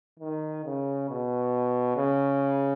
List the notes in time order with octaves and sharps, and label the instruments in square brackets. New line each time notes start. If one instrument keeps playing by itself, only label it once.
[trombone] D#3
C#3
B2
C#3